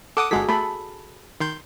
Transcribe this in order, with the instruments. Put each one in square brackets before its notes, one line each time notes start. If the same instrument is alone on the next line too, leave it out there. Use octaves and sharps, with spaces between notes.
[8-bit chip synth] A4 F#5 D#6 [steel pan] D6
[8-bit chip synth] G1 G#3 B6 [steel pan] F#4 G#4 A4
[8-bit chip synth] A3 [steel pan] A4 B5
[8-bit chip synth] D#3 C6 G6